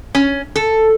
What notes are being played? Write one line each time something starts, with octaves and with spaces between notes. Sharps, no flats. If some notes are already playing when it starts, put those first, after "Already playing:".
C#4
A4